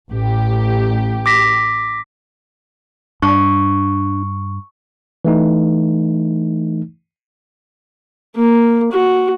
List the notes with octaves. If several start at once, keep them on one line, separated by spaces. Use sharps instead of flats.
A1 G4
D6 A#6 B6
G2 D4 C#6
E3 A3 D#4
A#3
F#4